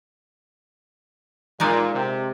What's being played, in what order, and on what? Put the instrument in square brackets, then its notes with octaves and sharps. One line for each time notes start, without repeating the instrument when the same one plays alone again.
[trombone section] A#2 [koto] G#3 D#4 D5
[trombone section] C3